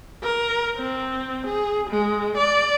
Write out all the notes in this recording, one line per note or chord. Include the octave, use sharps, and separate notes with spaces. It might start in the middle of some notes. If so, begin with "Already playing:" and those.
A#4
C4
G#4
G#3
D5